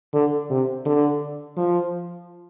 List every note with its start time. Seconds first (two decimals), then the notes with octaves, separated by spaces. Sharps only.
0.14 D3
0.50 C3
0.86 D3
1.57 F3